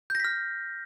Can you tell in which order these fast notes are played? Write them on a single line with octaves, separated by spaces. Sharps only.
G6 A#6 B6 F6